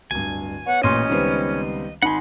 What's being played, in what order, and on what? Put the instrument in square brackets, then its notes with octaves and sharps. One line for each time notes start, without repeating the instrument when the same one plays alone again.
[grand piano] D1 G2 [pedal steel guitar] G#5
[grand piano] B3 C#5 [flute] F#5
[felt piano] A1 A#2 C6 [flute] C#4 [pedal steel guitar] D#5
[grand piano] C#2 C4 C5 [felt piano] D#3 G3 B3
[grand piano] G#1 G#5 [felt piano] D#4 [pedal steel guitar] F#5 C6 [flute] B5